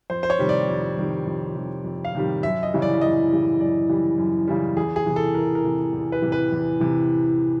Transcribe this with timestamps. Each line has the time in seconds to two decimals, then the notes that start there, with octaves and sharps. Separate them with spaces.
0.10 F2 C5
0.23 C5
0.30 C#5
0.39 C3 D#3 G3
0.49 D5
0.69 F2
0.97 C3 D#3 G3
1.26 F2
1.55 C3 D#3 G3
1.84 F2
2.05 F5
2.15 C3 D#3 G3
2.43 F#2 E5
2.63 D#5
2.73 C#3 E3 G3
2.82 D5
3.01 F#2 D#5
3.30 C#3 E3 G3
3.60 F#2 D5
3.89 C#3 E3 G3
4.18 F#2
4.47 C#3 E3 G3
4.76 E2 G#4
4.96 G#4
5.06 C3 E3
5.16 A4
5.35 E2 A#4
5.55 A#4
5.64 C3 E3
5.93 E2
6.12 B4
6.22 C3 E3
6.32 B4
6.52 E2
6.80 C3 E3